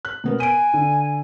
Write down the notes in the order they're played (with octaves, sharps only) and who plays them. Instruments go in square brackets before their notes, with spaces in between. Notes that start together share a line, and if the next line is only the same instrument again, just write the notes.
[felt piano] F#6
B2 B3 A#4
[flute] G#5 [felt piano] D7 D#7
[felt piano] D3